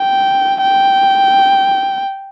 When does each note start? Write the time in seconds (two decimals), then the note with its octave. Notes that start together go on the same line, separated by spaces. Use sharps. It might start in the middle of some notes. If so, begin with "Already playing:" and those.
Already playing: G5
0.63 G5